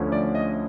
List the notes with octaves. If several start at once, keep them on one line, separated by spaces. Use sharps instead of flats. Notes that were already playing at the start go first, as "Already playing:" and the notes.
Already playing: D2 D3 F3 A3 C#4
D5
D#5